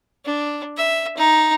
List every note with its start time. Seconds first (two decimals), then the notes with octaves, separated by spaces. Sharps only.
0.25 D4
0.77 E5
1.17 D#4